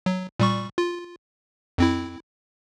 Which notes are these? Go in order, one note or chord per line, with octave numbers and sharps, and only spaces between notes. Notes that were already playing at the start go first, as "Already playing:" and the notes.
F#3
A#2 G3 C#6
F4
F2 C4 E4